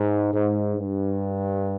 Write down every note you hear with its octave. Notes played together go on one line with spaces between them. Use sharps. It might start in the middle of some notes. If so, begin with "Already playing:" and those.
Already playing: G#2
G#2
G2